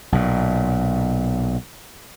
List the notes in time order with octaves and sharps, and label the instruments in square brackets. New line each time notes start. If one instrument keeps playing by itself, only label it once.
[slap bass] B1 A#2